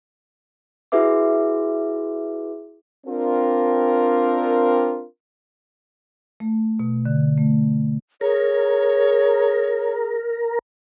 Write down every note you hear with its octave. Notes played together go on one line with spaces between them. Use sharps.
E4 F#4 G#4 B4 E5 D6
C4 D4 F4 A#4
A3
B2
D3
A3
G#4 A#4 C#5